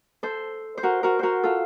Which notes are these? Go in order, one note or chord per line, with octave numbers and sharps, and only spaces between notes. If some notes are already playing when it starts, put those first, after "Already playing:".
A4 C5
C5
F#4 A#4
F#4 A#4
F#4 A#4 C5
F4 A4